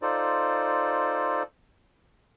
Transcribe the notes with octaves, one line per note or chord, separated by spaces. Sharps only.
D#4 F4 A4 C5 D5